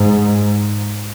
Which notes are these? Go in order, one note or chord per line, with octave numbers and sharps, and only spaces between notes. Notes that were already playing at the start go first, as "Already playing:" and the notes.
Already playing: G#2